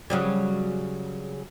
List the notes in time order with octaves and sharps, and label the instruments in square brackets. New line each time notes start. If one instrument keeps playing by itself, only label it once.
[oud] C#3 F#3 G3